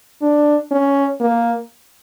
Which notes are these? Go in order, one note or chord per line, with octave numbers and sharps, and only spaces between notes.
D4
C#4
A#3